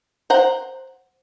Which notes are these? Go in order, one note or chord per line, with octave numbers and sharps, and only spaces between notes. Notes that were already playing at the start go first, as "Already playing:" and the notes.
C5 F#5 A#5